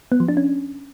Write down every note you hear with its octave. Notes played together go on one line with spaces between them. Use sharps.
B3
F3
D4
C#4